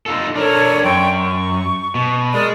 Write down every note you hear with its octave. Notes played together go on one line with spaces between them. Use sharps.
D#4 F4 A4
D4 A4 A#4 C#5
F#2 G5 C6 C#6
C#6
B2
G#3 A#4 D5 D#6